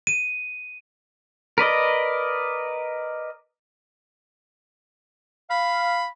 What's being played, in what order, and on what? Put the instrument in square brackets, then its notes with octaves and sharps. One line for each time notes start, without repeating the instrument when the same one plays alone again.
[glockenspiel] D#7
[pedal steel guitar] A#4 B4 D5 D#5
[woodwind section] F5 [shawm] B5